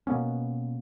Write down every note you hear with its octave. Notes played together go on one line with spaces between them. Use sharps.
B2 A#3 B3 C#4